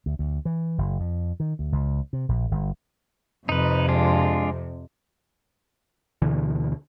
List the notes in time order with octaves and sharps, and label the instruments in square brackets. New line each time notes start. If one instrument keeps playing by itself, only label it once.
[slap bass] D2
D2
E3
F#1
F2
D#3
D2
C#2
C3
A#1
G1
[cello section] F2 C3 [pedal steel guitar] D#4 B4
[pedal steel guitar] G#3 D4 F4
[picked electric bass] D2 B2 D3 E3